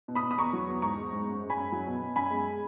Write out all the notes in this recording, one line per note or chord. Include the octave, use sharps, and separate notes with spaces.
B2
B5 D#6
B2
D#6
E2 A#5 C#6
F#3
E2
G#2 A#5 C#6
G#3
G#2
F#2
G#3
G#5 B5
F#2
F#3
B2
B2
F#2 G#5 B5
G#3